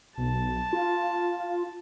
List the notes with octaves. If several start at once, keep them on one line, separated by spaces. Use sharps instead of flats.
B1 A5
F4